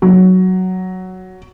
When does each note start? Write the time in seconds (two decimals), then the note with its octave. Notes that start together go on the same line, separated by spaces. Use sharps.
0.02 F#3